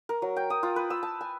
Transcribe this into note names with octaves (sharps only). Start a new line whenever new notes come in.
A#4
F#3
G5
D#6
F4
B4
E6
A5
G#5